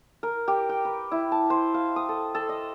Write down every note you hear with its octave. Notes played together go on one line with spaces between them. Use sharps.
A#4
G4
G5
B4
E4
A5
C5
F5
D#6
A4
A4
D#5